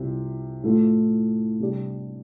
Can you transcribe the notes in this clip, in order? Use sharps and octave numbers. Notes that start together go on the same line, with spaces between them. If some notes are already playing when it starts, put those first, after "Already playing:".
Already playing: C2 C3 G3 F4
A2 A3 F4
C3 G3 D4 G4